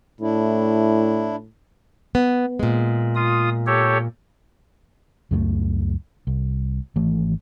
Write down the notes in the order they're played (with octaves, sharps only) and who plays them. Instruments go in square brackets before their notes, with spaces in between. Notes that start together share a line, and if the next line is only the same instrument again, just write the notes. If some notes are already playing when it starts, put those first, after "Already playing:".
[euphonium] A2 [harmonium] D4 E4
[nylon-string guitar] B3
A#2 G#3
[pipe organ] F4 D#6
G4 A4 C#5
[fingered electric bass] C#2 F#2 G3 A3
C2
G#1 E3 A3